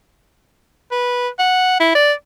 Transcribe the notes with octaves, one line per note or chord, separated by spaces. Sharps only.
B4
F#5
E4
D5